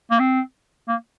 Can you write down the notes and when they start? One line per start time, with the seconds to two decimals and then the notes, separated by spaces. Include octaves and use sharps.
0.11 A#3
0.19 C4
0.88 A#3